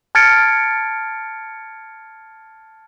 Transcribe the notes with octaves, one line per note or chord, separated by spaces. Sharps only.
A5 F6 G#6 A6 C#7 D7